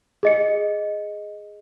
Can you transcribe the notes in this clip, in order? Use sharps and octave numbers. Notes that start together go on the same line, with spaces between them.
G#4 D#5 C#7